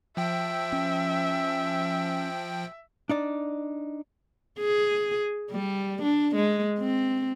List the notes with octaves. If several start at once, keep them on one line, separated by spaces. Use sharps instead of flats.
F3 E5 G5
C#4
D4 D#4 D5
G#4
G3
D4
G#3
C4